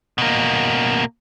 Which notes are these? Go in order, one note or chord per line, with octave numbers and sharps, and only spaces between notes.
B2 A#3